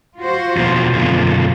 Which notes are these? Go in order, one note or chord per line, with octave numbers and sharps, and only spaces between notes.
F4 F#4 C5
E2 B2 F3
F#2 B2 D3 A#3 C4 F4